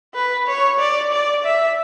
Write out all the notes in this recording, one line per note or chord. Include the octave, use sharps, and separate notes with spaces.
B4
C#5
D5
D5
E5